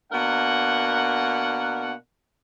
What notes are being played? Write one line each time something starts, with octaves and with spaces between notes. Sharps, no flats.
B2 A#3 D4 A#4 F#5